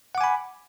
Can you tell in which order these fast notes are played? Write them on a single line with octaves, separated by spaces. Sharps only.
F#5 D6 G#5 B5